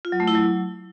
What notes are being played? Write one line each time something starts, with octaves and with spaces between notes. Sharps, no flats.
F4
F#3
A3
E4
F#3